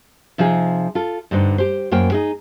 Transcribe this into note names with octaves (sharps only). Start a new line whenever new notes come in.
C3 F3 D#4 F4 G#4
F4 A4
G2 D3 D#4 C5
G4 C5
F#2 A#3 A#4 C5 G5
D#4 G#4